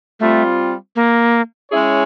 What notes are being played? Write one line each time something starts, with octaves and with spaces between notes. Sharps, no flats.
G3 A3 C4 F4
A#3
G#3 C#4 E4 G#4 C#5